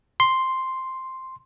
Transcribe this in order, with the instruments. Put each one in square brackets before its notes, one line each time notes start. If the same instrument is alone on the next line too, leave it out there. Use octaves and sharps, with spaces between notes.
[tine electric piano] C6